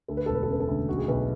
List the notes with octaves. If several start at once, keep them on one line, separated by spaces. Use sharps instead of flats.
D2 A4
B4
E1 A4
B4
A4
C#3 B4
A4
D2
B1 F#4
G#4
B1 B4